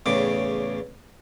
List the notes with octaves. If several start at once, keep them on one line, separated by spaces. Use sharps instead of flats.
E2 A2 C#3 D5 D6